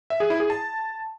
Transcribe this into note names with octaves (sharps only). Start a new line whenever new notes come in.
E5
G#4
E4
G#4
A5